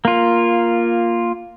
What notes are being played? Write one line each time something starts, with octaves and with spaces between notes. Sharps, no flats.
A#3 F4